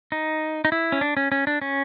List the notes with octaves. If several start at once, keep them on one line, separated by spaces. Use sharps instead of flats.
D#4
D#4
E4
C#4
D4
C#4
C#4
D4
C#4